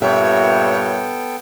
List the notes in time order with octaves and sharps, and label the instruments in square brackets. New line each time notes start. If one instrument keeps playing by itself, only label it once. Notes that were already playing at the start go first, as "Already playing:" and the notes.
[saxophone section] G2 A#2 [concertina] B3 A4 G5 [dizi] C#5 [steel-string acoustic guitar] E5